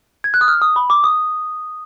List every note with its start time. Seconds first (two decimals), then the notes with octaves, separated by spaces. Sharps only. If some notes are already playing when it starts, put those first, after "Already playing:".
0.24 G#6
0.34 F#6
0.41 D#6
0.48 F6
0.62 D#6
0.76 B5
0.90 D6
1.04 D#6